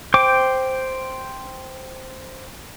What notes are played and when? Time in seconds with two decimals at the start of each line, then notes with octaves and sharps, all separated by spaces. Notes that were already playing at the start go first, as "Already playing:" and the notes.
0.14 C5 G5 D6